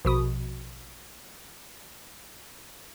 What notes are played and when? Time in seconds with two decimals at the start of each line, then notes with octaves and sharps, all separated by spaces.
0.05 A#1 B2 D#6